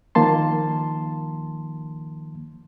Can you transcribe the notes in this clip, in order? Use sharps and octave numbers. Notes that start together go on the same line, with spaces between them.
D#3 F3 A#3 A5 C6